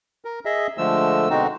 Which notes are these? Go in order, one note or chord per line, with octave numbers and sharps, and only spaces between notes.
A#4
G#4 D#5 E5
D3 F3 G#3 A3 E6
B2 D3 G#3 C4 D#4 F#4